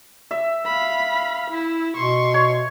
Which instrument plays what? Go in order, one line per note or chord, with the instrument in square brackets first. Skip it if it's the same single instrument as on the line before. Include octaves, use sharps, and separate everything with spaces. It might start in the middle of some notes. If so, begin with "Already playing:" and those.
[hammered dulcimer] E5
[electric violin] F5 B5
E4
[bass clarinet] B2 [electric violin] C6 C#6
[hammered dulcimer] C#5